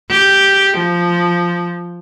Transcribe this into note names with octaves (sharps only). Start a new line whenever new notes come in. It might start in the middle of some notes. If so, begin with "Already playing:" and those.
G4
F3